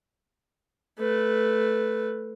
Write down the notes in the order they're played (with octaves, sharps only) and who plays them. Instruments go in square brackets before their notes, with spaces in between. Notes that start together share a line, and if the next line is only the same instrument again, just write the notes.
[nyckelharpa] A3 B4